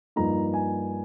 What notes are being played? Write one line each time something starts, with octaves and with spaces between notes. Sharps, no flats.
G2 F3 A#3 D#4 A#5
G#5